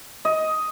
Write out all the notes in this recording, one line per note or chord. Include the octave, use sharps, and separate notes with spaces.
D#5